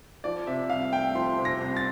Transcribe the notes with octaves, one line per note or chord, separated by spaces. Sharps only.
F3 D5
C3 E5
C2 F5
A3 G5
F3 C6
C3
A#6
C2
A6